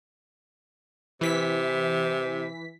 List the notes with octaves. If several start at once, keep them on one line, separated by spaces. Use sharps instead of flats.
C3 E3 B6